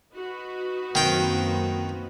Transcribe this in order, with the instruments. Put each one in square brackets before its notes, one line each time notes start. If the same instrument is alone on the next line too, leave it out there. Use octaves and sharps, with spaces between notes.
[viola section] D#4 F#4 B4
[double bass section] F#2 A#3 C4 [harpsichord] D#3 G5